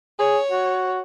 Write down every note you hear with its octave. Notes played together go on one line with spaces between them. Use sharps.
G#4 C#5
F#4